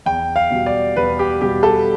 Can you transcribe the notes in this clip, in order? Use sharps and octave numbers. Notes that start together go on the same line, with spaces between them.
E2 G5
F5
B2 G3
D5
E2 B4
G4
B2 G3 G4
A4